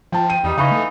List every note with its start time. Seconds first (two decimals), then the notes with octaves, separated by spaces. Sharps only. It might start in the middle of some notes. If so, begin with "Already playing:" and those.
0.12 F3 G5 A5
0.30 G5 D#7
0.44 E2 G3 D#4
0.58 C#3 E3 D#4 F5 B5 C#6
0.71 A3